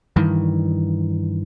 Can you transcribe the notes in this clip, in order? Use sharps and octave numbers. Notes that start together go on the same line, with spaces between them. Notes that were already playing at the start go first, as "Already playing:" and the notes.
G2 D#3 E3